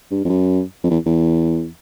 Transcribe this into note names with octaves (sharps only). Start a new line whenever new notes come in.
G2
F2
F#2
F2
E2
E2